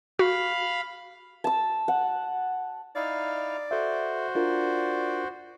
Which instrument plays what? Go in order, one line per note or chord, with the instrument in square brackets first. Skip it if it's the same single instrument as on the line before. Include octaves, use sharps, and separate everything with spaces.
[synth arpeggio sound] F#4 [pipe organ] F5 B5
[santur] A5 E6
F#5
[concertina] D#4 E4 F5 [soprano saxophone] D5
[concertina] F#4 C5 [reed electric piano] A4 E5
[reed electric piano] D4 F4 A#4 [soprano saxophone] D5